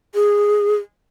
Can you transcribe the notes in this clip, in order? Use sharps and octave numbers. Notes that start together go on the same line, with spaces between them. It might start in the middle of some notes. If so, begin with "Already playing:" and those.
G#4